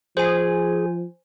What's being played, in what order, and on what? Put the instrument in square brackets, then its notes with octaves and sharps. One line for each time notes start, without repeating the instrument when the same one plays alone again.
[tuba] F3 [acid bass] G#4 [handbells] C5 G#5